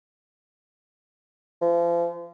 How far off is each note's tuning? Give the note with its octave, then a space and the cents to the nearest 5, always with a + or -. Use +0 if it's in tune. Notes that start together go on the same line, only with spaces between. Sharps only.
F3 -35